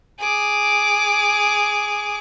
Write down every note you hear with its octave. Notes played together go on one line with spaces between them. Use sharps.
G#4 D6